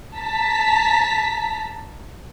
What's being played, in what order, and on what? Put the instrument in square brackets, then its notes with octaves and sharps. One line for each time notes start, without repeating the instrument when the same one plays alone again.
[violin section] A5 A#5 B6